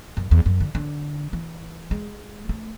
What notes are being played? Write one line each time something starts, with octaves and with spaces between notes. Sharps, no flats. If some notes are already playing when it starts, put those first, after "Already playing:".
F#2
E2
F#2
D3
D3
E3
G#3
A3